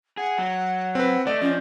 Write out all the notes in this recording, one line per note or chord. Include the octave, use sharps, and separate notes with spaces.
G#4 F#5
F#3
C4 B4
A3 D5 D#5
F3 C#4